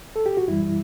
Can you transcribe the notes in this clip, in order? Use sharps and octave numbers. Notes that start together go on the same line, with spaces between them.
A4
G4
F#4
F#2 E3 G3 E4